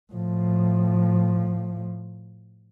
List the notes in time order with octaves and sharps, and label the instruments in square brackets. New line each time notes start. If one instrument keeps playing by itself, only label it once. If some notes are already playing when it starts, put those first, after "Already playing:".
[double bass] A2 F3